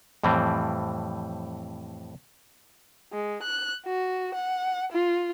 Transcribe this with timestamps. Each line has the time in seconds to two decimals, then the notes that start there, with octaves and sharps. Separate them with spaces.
0.24 F2 A2 E3 G3 C4
3.13 G#3
3.43 F#6
3.86 F#4
4.34 F#5
4.92 F4